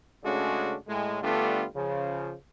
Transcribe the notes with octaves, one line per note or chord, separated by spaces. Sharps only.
C#3 G#3 A3 C#4 D4 F#4
A2 G#3
D3 G3 A3 B3 D4 F4
C#3 F3